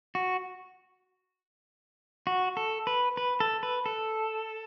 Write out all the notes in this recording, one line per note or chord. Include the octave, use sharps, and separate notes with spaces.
F#4
F#4
A4
B4
B4
A4
B4
A4